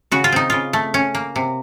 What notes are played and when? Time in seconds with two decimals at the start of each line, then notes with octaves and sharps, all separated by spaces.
0.12 C#3 F#4
0.24 F4
0.32 C4 D#4
0.50 C#3 F4
0.73 A3
0.94 C#4
1.15 A#3
1.36 C3